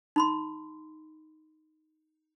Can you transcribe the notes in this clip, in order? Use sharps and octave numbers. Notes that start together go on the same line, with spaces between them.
D#4 B5 C6